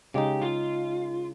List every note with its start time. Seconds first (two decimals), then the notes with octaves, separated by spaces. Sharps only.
0.14 C#3 G#3 D#4 G4
0.42 F4